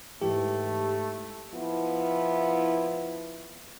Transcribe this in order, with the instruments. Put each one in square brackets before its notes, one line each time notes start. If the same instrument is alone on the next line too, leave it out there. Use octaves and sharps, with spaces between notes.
[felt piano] G#2 E3 G5 [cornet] A3 [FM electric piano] G4
[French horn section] F3 B3 E4